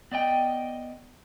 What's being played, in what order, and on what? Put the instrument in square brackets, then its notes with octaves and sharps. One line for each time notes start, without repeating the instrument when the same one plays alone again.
[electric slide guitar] B3 D5 D#5 G5